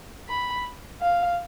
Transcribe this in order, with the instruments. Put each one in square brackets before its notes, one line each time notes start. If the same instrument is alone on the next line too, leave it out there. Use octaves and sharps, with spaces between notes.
[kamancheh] B5
F5